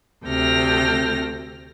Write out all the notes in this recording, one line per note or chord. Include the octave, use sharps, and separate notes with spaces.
D2 C3 A4 G5 F6 A#6